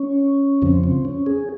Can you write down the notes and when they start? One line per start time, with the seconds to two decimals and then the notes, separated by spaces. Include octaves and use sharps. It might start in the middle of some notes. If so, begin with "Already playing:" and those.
Already playing: C#4
0.62 F2 C#3 F3 C4
0.84 C4
1.05 C#4
1.26 G#4